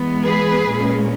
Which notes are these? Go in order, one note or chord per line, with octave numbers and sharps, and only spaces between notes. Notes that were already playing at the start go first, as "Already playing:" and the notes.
Already playing: E3 G#3 B3
G#4 B4
A#2 G#3 C#4